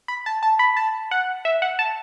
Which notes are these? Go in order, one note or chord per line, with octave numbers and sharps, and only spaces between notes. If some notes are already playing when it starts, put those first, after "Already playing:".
B5
A5
A5
B5
A5
F#5
E5
F#5
A5